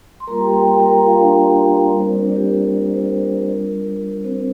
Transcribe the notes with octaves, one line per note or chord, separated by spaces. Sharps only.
C6
G3 A#3 F4 A#4 A#5
G4 G5
G4 G5
G4 G5
A#4 A#5
G4 G5
F4 F5
D4 D5
A#4
G4
G3 A#3 D4 F4 A#4
C4 C5
D4 D5
A#4
G4
A#4
G4
A#4
C5
A#4
G3 D4 F4 A#4
C4 C5